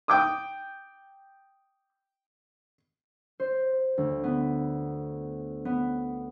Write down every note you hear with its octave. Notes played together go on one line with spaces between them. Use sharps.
G5 D6 D#6
C5
D2
B3
B3